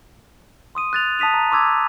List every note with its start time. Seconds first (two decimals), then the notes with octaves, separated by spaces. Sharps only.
0.75 C6 D#6 D#7
0.93 F#6 A6 F7
1.19 A5 D#6 B6 D#7 F7
1.34 A#5
1.51 C6 D6 E6 G#6